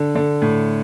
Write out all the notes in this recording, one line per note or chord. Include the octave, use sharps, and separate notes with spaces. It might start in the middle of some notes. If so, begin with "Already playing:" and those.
Already playing: D3
D3
A2